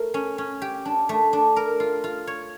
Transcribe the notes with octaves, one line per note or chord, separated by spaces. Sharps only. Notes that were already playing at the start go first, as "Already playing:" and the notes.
Already playing: A3 A#4
C#4
C#4
G4
D4
A3
D4
A#4
F4
F4
C#5